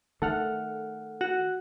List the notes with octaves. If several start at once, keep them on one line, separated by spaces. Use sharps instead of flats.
D#3 A3 A4 F#5 F6
F#4